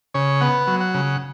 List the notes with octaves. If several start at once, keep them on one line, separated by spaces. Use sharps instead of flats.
C#3 C#5
B3 F#5
F#3
F#5
C#3